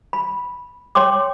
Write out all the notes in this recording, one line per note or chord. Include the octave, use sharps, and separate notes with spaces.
B5
C#5 G5 C6 D6